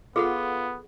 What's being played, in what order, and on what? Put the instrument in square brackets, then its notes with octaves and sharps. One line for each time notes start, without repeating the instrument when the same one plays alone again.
[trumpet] B3 [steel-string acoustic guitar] F4 [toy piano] G#4 A4 F#5